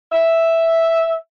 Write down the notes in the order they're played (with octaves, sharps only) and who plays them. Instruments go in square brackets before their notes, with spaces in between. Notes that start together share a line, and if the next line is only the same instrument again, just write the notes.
[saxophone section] E5